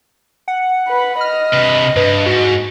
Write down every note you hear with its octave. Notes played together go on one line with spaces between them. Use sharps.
F#5
B4 B5
D#5 F6
C3 B4
G2 B4
G#2 F#4